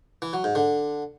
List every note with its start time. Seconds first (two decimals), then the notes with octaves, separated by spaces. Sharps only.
0.22 E3
0.33 F#3
0.44 G#2
0.55 D3